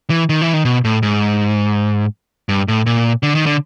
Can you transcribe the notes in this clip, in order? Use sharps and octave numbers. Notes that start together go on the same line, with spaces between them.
E3
D#3
E3
D#3
B2
A2
G#2
G2
A2
A#2
D3
D#3
D3